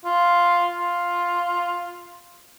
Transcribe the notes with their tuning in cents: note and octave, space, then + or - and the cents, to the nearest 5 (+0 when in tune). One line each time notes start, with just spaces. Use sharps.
F4 +0
F4 +5